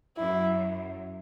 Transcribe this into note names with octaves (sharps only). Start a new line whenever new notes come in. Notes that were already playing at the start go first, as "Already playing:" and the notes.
F#2 E4